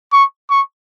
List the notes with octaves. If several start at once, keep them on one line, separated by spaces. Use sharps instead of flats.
C#6
C#6